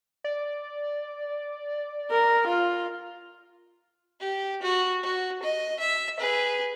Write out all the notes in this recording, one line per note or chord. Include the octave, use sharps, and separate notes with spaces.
D5
A#4
F4
G4
F#4
F#4
D#5
E5
G#4 B4